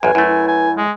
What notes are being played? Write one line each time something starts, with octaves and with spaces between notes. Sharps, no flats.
A1 F#2 B4 G#5
F#2 A3 E4
E4
G#5
G#3